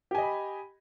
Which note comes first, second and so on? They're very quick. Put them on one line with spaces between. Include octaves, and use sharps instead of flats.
G4 G#5 D#5 B5